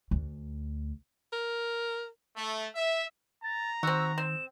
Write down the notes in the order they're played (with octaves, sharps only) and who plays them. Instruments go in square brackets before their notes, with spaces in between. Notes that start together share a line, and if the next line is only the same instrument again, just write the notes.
[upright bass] D2
[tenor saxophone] A#4
[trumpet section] A3
E5
[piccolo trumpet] A#5 [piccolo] A6
[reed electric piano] D#3 [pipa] C4 F#4 [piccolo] E6
[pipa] C4 [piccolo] E7